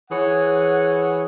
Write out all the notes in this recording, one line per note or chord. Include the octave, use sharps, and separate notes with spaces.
E3 G#4 C#5 F#5